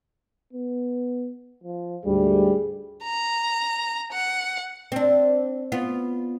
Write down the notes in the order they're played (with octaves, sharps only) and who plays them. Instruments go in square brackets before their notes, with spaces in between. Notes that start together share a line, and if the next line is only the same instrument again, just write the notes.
[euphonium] B3
F3
[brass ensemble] D2 G#2 G3 [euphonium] G#4
[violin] A#5
F#5
[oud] C4 D4
B3 F4